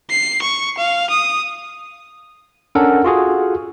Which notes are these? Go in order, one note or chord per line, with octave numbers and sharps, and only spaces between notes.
C7
C#6
F5
D#6
C#4 D4 A4 A#4 F#5
F4 F#4 G#4 A4